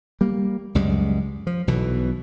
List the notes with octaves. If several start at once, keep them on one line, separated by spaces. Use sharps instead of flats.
G3 A#3
C#2 F#2 G3 G#3
F3
B1 B2 E3